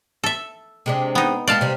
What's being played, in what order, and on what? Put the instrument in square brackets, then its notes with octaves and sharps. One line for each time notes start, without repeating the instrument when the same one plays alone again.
[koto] A4 E5
[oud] C3 G#3 D4
[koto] B3 D#4
[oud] G#3 G4 [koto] D5 F5 A5
[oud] C3 G3